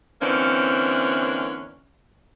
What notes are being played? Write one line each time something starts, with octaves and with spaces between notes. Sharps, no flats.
D3 E3 A#3 C4 C#4